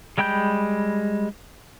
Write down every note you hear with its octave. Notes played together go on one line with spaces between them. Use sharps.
G3 G#3 G5 B5 G6